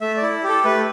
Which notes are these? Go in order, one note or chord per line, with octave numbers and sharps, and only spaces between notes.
A3 E5
D5
E4
G4
A4
A3 B4